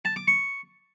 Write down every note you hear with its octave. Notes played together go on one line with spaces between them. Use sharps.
A5
D6
C#6